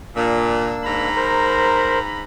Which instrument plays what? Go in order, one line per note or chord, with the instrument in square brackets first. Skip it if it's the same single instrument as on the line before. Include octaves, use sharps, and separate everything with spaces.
[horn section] A#2 [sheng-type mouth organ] A#3 D4 E6
[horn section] G#2 A#5 B5
[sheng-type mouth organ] A#4 C5